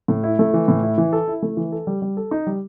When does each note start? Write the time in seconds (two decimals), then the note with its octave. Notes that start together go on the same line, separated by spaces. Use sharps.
0.08 A2
0.24 E4
0.39 A3
0.54 E3
0.68 A2
0.83 E4
0.98 E3
1.13 A4
1.28 E4
1.42 A3
1.57 E3
1.72 A4
1.87 G3
2.02 G3
2.17 A4
2.31 D#4
2.47 G3